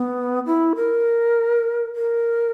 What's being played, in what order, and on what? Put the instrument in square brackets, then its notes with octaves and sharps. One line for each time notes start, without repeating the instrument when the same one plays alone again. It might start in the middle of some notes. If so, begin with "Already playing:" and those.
Already playing: [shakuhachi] B3
E4
A#4
A#4